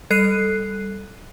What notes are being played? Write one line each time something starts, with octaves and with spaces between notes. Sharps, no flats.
G3 A4 F#6 C7 D#7